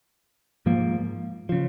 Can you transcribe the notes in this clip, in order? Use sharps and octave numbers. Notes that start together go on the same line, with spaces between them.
G#2 F3 A#3
C#3 F3